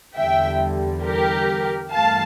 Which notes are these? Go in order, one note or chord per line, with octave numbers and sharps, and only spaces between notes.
E2 D3 G3 E5 G5
G4 A#4
G2 E3 A3 F5 A5